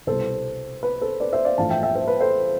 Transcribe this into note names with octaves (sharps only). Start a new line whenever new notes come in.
C2 B2 G3 A4 C5
B4
A4 C5
B4 D5
C5 E5
D5 F5
A1 G2 F3 A3 F5 A5
E5 G5
E5 G5
C5 E5
B4
A4 C5